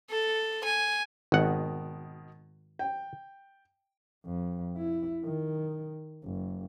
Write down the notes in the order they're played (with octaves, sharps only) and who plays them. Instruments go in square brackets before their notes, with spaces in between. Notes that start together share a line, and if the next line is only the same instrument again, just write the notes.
[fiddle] A4
G#5
[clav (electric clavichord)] G#1 F#5 [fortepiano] B2 D#3
[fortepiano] G5
[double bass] F2
E4
D#3
F#1